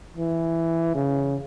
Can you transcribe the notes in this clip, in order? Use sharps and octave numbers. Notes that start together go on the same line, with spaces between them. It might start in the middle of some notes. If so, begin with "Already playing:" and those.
E3
C#3